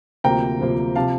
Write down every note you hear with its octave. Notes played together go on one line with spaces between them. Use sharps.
D2 C3 F3 A#3 G5 A#5
D2 C3 F3 A#3
C3 F3 F5 A5